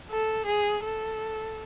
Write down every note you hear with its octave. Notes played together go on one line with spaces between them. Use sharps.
A4
G#4
A4